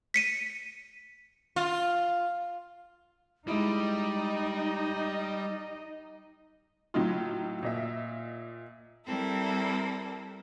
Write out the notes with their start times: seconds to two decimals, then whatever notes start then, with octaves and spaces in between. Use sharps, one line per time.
0.14 B6 C#7 D#7
1.56 F4
3.47 G3 G#3 D#4 E4 D#5
6.94 A2 F#3 D#4 F4
7.63 A#2 D#5 E5
9.06 G3 C4 E4 A4 A#4